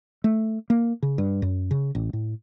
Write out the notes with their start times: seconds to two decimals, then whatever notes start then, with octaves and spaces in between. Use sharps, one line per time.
0.24 A3
0.70 A#3
1.02 C#3
1.18 G2
1.42 F#2
1.71 C#3
1.95 A1
2.13 A2